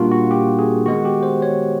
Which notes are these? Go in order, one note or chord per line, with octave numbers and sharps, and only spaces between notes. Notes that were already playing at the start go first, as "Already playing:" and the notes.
Already playing: A#2 G3 A#3 D4 F4 F#4
F#4
G4
G#4
D#3 G#3 B3 F#4
G4
C5
C#5